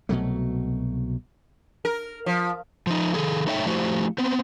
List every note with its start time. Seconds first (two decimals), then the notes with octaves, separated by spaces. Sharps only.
0.09 C2 B2 F#3 A3
1.85 A#4
2.26 F3
2.87 F3 D#4
3.14 D#3 G#4 A4
3.47 A3 D#4 C#5 E5 F5 G5
3.66 F3 A3 E4 F#4 G4 C5
4.18 B3 C4